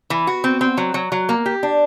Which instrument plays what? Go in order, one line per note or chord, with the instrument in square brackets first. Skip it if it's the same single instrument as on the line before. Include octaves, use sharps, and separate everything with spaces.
[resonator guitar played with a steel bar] E3
F#4
C4
C4
F#3
F#3
F#3
A#3
G4
D4